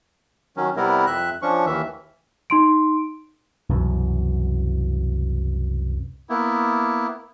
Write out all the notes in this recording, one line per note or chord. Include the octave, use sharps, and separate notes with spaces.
D#3 F#3 C#4
C3 G3 B3 E4 A#4
F2 E5 F#6
F3 C#4 D4 C#6
D#2 D#3 E3 E5
D#4 C6 D7
C2 F#2 B2 E3
A#3 B3 E4